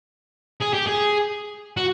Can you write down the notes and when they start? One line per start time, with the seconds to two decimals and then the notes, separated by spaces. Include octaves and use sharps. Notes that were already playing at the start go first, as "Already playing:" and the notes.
0.61 G#4
0.74 G4
0.87 G#4
1.77 F#4